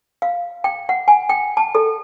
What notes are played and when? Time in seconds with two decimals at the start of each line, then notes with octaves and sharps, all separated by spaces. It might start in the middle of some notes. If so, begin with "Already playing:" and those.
0.22 F5
0.64 G5
0.89 F#5
1.08 G#5
1.29 G5
1.57 A5
1.75 A4